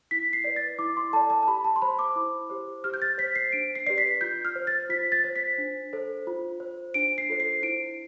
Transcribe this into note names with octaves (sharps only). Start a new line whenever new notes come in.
E4 B6
C7
B4 D5
A6
E4 D6
C6
A4 D5 A5
A5
A5
G4 B5
A5
C6
C5 B5
D6
E4
G4 C5
G4 F6
G6
A6
C5 B6
C7
D4 D7
C7
G4 B4 D5 C7
B6
F4 G6
F6
C5
A6
F4 B6
A6
C5
B6
D4
A4 C5
F4
C5
D4 D7
C7
F4 A4 C5
C7
E4 D7